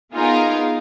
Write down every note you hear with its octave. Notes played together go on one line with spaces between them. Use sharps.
B3 D#4 F4 G#4 A#4